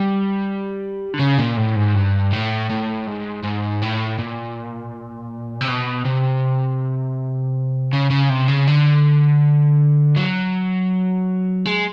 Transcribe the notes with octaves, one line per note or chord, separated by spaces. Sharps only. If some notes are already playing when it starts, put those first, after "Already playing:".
Already playing: G3
D3
C#3
A#2
A2
G#2
G2
A2
A2
G#2
G#2
A2
A#2
C3
B2
C3
C#3
C#3
C3
C#3
D3
F#3
G#3